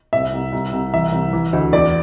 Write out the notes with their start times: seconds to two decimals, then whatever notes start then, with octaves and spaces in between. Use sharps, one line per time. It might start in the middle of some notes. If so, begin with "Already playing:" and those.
0.13 C2 E5
0.33 C2
0.53 C2
0.73 C2
0.94 E3 E5
1.12 C2
1.33 E3
1.53 D2
1.73 E2 D5